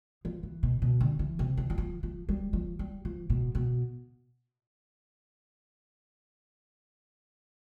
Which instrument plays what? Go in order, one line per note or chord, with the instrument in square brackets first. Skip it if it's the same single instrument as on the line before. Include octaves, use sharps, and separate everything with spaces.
[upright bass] F3
E3
B2
B2
D3
E3
C3
E3
E3
F3
F3
G3
F3
G3
F3
B2
B2